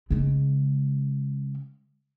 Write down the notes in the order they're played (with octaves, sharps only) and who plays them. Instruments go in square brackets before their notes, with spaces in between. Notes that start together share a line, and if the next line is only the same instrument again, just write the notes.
[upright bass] C#3 G#3